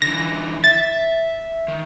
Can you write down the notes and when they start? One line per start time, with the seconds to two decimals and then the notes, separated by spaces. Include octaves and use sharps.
0.02 D3 E3 A#6
0.64 E5 A6
1.68 D#3